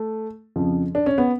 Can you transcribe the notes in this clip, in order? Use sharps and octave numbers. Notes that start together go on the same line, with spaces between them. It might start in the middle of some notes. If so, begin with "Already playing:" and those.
Already playing: A3
F2 C#3 F3
D4
C#4
B3